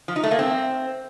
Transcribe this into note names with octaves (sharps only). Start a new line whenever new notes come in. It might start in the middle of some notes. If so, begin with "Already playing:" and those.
F3
D#4
A3
A#3
C4